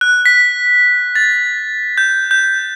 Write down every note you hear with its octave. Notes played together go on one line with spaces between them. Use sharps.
F#6
B6
A6
G6
G6